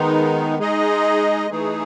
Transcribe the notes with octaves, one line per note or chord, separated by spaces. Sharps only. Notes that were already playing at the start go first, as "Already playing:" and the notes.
Already playing: D#3 G#3 B3 D#4
G#3 D#4 G#4 D#5
E3 A3 D#4 G#4